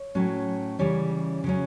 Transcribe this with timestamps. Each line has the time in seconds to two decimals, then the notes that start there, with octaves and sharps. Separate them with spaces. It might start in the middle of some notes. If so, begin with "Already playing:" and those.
Already playing: C#5
0.15 A2 F#3 C#4
0.79 C#3 E3 G3 C#4 C#5
1.44 C#3 F#3 C#4